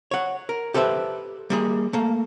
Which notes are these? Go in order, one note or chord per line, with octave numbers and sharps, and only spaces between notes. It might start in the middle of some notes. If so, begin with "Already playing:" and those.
C#5 F#5
A#4
G4 A4 B4 C5 E5
G3 A#3 G#4
A3 A#3